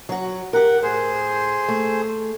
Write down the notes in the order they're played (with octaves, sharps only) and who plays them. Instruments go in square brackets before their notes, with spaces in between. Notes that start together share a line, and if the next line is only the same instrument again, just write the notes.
[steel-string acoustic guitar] F#3 F#4
[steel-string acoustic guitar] G4 A#4 [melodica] F#5
[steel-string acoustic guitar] A2 [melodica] G#4 C5
[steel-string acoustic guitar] A3